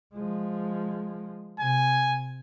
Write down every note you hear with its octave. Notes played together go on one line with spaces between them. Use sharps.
F3 G#3
C3 G#5